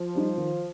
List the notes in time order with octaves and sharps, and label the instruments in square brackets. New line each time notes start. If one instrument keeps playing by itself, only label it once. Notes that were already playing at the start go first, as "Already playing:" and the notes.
Already playing: [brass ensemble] F3
[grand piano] G3 D#4
D#3